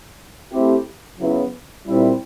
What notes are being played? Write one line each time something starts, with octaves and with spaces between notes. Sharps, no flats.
A3 C4 E4 G4
C#3 F#3 B3 E4
A#2 G3 C4 E4